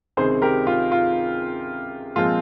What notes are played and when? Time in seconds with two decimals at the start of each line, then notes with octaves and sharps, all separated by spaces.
0.17 C#2 C3 D#3 G#4 C5
0.42 G4 A#4
0.67 F4
0.92 F4
2.16 A#2 F3 G#3 C4 F4